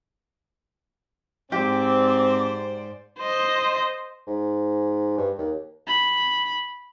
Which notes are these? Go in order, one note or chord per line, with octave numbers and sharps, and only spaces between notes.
G#2 C4 G4 C5 D5 D6
C5 D#5
G#2
G2
D#2
B5